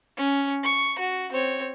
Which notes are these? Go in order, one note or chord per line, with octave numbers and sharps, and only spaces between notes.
C#4
C#6
F#4
C4 C#5